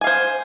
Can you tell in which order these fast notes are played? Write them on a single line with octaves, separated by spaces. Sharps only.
G#5 F5 C5